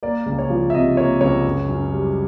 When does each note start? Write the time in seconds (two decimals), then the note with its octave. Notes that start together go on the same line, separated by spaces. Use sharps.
0.03 A#3 D5
0.26 C#2
0.39 C#5
0.50 F3
0.70 E5
0.74 C3 D#5
0.97 A#3 C#5
1.21 C#2 C#5
1.44 F#2
1.68 F#2
1.92 G3